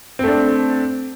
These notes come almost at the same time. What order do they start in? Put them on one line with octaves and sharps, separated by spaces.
C4 A3 D4